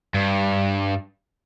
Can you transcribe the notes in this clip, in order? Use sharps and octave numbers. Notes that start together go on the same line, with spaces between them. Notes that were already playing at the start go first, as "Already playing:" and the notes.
G2